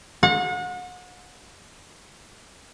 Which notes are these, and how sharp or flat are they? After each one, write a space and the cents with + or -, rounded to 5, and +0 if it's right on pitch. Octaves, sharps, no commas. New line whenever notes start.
F#5 -35